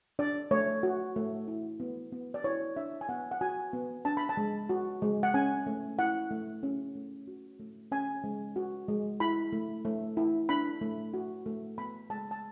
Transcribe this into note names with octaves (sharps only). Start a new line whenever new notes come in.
D4 D5
A3 C#5
F#4
A3
E4
B3
B3
D5
E4 C#5
D4 E5
G#5
B3 F#5
F#5
F#4 G#5
B3
D4 A5
B5
A5
G#3
F#4
G#3
F#5
C#4 G#5
A3
E4 F#5
A3
C#4
A3
F#4
A3
C#4 G#5
G#3
F#4
G#3
E4 B5
A3
A3
E4
D4 B5
A3
F#4
A3
B3 B5
G#3 A5
A5